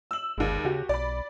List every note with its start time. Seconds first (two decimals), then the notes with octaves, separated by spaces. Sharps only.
0.11 E6 F#7
0.38 G1 D#2 G#3
0.65 C#3 F#4 G4
0.89 B1 D5 B5